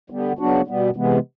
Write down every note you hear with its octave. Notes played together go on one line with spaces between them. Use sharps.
D3 G3 B3
C#3 F#3 B3 D4 F#4
B2 G3 B3
C3 E3 G#3 B3